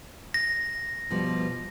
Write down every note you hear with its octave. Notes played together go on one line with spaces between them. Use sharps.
A#6
B2 F3 G3